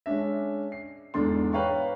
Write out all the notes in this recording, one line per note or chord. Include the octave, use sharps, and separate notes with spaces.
G#3 C#4 D4 E5
C7
E2 G#2 D4 A4 C6
B4 C#5 F5 G5 A#5 C#6